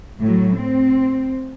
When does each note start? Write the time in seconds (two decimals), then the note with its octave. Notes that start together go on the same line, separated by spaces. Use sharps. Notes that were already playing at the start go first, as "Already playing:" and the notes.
0.20 A2 F#3
0.57 C4